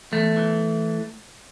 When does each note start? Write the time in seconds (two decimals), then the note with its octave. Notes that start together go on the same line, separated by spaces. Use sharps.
0.12 E2 A3
0.36 E3